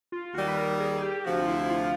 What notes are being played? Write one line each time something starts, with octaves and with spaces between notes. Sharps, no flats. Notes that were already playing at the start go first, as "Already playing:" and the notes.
F4
D#2 D#3 G3 F#4
B4
A#4
G#4
G4
D2 C3 F3 F#4
F4
E4
F4